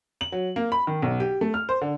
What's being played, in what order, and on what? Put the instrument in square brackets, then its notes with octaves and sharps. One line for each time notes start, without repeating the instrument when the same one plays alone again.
[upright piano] F#7
F#3
A#3
B5
D#3
B1
G4
A3
F6
C5
D3